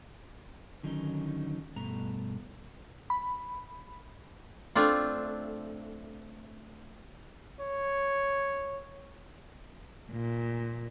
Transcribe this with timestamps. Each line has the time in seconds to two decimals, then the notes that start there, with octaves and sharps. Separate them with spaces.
0.83 D3 D#3 F#3 C#4 D#4
1.76 G2 B2 A3 A#5
3.10 B5
4.75 A3 C4 D4 F4
7.60 C#5
10.10 A#2